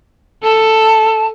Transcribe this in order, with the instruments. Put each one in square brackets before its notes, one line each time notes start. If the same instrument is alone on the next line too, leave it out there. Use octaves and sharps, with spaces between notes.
[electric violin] A4 [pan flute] A5